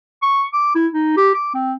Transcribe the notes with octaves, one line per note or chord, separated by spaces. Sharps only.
C#6
D6
E4
D#4
G4
D6
C4